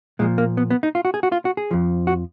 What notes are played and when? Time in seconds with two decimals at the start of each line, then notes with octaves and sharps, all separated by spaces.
0.19 A#2 F3 G#3
0.38 A#3
0.57 B3
0.70 B3
0.83 D#4
0.95 F4
1.05 F#4
1.14 G#4
1.23 F#4
1.32 F4
1.45 F#4
1.57 G#4
1.71 F2 F3
2.07 F#4